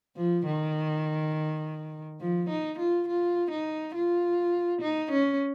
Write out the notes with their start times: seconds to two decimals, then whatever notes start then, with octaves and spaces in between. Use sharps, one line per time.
0.16 F3
0.46 D#3
2.20 F3
2.49 D#4
2.78 F4
3.08 F4
3.50 D#4
3.94 F4
4.81 D#4
5.11 C#4